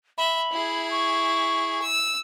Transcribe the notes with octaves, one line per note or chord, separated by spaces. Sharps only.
E5 B5
E4 G#4
C#6
E6